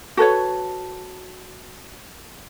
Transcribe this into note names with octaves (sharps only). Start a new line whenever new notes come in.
F#4 A4 B4 C#5